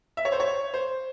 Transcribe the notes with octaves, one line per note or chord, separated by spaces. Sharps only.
E5
C#5
C5
C#5
C5